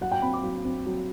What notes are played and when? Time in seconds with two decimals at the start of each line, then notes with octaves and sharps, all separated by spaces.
0.01 F#3 F#5
0.12 G5
0.22 C4 B5
0.33 D6
0.43 F#3
0.65 C4
0.86 F#3